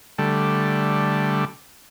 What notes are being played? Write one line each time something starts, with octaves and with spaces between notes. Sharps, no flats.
D3 G3 A3